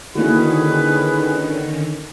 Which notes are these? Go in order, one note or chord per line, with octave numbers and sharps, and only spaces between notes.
D3 D#3 A#3 C#4 E4 F#4 G#4 B4